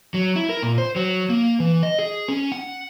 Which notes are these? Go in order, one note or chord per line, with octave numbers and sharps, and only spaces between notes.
F#3
E4
A#4
A#2
C5
F#3
A#3
E3
D#5
G#4
C#4
F#5